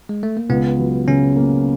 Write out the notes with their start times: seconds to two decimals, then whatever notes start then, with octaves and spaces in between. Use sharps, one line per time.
0.09 G#3
0.23 A3
0.37 A#3
0.49 C#2 B3
0.79 F#3
1.08 C#3 C#4
1.36 A#3